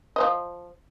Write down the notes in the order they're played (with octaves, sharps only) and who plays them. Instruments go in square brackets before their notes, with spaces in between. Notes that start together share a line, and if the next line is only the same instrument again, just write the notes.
[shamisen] F3 C5 D#5